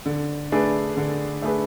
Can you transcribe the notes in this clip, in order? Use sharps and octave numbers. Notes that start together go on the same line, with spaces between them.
D3
A3 D4 G#4 B4
D3
A3 D4 G#4 B4